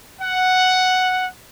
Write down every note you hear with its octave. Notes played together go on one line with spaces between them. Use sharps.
F#5